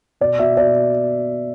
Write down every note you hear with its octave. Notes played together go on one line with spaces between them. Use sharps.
B2 D5
B2 E5
B2 D5